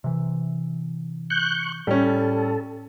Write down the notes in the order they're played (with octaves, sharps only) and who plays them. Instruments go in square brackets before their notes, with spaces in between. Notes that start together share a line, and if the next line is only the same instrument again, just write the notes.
[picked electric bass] C3 E3
[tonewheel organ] C#6 F#6 G6
[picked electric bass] A2 [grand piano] G3 C#4 [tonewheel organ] A4